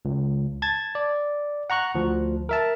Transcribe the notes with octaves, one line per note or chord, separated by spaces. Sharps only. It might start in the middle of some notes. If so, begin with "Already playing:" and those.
C#2
A5 G#6 A6
D5
F#5 A#5 C#6 F#6
D2 F3
A#4 E5 A5